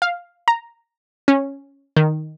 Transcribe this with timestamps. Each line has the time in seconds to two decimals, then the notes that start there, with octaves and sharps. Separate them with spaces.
0.02 F5
0.48 A#5
1.28 C#4
1.96 D#3